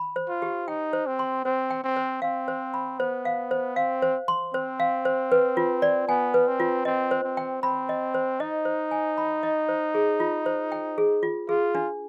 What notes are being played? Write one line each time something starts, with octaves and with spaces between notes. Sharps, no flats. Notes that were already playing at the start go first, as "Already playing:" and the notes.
Already playing: B5
C5
F4
G4
D#4 G5
C5
C4
C6
C4 C5
G5
C4
C5
C4 F5
C5
B5
B3 C5
F5
C5
C4 F5
C5
C6
C4 C5
F5
C5
B4
F4
D5
B3 G#5
B4
C4
F4
C4 D#5
C5
C4
G5
C4 B5
D#5
C5
D#4 D#5
C5
G#5
B5
D#5
C5
G#4
F4
C5
G5
G#4
F4
F4 G#4
D4